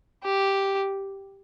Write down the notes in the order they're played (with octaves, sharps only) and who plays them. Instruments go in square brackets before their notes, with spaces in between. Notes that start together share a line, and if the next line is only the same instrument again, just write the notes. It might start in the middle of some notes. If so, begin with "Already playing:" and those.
[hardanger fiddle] G4